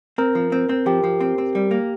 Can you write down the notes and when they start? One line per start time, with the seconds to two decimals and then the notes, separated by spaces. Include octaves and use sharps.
0.18 C4 A#4
0.35 F3
0.52 C4
0.69 C4
0.86 F3 G4
1.04 F3
1.21 C4
1.38 C4
1.55 G3
1.71 A#3